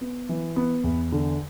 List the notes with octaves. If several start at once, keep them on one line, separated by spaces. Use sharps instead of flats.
B3
E3
B3
E2
D3